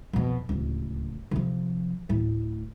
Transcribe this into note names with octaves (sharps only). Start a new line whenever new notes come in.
F2 B2
D1 C#2
C3 F3
D1 A2